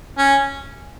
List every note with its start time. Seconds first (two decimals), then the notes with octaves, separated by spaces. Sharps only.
0.18 C#4